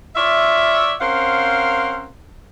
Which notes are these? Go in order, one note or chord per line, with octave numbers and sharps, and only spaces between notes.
F4 C#5 D5 E5
C4 C#4 A#4 C5 F5 F#5